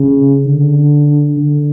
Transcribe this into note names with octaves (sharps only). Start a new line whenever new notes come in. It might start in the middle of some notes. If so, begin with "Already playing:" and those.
Already playing: C#3
D3
D3